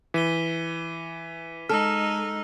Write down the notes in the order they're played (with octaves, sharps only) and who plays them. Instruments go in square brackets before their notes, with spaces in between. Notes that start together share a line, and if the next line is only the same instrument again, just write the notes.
[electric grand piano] E3 [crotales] B6 D#7 G7
[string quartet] G#3 D#4 [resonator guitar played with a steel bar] A4 [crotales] E6 F6